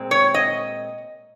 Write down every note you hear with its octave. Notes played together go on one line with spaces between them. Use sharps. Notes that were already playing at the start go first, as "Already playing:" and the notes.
Already playing: A#2 G#3 C4
C#5
D#5